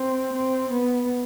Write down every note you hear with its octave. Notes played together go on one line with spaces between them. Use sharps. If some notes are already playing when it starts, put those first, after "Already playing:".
Already playing: C4
C4
B3